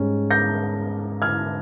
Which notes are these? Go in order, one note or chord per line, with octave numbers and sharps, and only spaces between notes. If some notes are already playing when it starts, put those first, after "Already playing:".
Already playing: G#2 G3 C#4
G6 A#6
F6 G#6